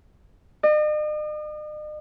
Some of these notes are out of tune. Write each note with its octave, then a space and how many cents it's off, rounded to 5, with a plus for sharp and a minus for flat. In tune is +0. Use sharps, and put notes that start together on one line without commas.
D#5 -45